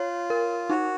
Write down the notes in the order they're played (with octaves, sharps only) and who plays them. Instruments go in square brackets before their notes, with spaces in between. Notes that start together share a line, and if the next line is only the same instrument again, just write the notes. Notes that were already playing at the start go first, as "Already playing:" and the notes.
Already playing: [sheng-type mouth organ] F4 [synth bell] C#5
[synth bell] A#4
[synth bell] D#4 [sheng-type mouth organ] F#4